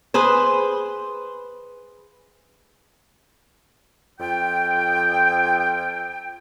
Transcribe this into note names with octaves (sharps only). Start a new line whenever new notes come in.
G#4 B4 C5
F2 F4 G5